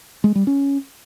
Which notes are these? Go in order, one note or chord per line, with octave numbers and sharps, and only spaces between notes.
G#3
G3
C#4